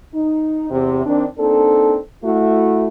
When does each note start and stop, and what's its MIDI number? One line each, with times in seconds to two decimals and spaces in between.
0.14 0.70 63
0.71 1.03 40
0.71 1.03 48
1.05 1.25 51
1.05 1.25 60
1.05 1.25 62
1.38 1.96 58
1.38 1.96 60
1.38 1.96 62
1.38 1.96 63
1.38 1.96 69
2.24 2.88 57
2.24 2.88 64
2.24 2.88 66